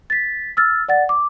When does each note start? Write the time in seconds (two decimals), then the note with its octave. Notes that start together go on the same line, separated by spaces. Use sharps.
0.10 A6 B6
0.57 E6 F6 A6
0.88 D5 F#5 A6
1.09 D6